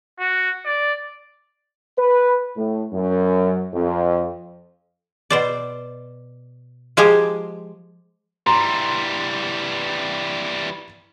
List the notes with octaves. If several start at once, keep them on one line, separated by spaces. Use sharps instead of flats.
F#4
D5
B4
A2
F#2
F2
B2 C5 D5
F3 G#3 G4 C5 G#5 A#5
E3 G3 A#5 C6